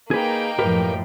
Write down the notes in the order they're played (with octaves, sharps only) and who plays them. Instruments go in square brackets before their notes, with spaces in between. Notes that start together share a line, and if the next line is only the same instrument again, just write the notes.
[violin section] A#3 D#4 G5 [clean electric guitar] G#4 B4
[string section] F#2 A2 F3 [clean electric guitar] G4 A#4 B4